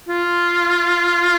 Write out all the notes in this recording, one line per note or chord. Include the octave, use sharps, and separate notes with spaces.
F4